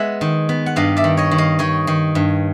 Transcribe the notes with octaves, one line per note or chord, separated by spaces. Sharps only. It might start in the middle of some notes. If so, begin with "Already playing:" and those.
Already playing: G#3 B3 E5 F#5
D#3
B3
F#5
G2 D#5 F5
D5 E5
D#3
C#5 D#5
D#3
D#5 F5
D#3 C#5 D#5
D#3
G2